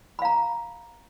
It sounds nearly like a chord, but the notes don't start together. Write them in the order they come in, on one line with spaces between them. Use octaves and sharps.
B5 F5 A#5